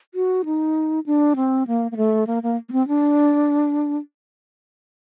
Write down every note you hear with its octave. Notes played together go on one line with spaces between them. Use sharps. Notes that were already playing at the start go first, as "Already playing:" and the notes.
F#4
D#4
D4
C4
A#3
A#3
A3
A#3
A#3
A#3
C4
D4